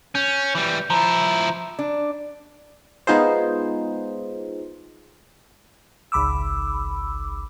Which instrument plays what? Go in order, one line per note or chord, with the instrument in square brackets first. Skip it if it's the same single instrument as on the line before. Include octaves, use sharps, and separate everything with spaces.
[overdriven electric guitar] C#4 [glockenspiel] G6
[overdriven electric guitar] E3 G3
[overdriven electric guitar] F3 E4 [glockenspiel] A#5
[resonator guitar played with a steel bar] D4
[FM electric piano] G#3 B3 D#4 F4 G#4 C5
G#1 C#2 B5 D6 E6